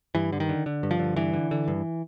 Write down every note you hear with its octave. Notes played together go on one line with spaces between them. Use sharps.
G2 E3
D3
D#3
D3
D3
G2
F3
D3
G2 E3
D3
D3
G2